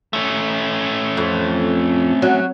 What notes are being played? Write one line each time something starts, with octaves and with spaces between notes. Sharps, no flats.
A3 C#4
F2
F#3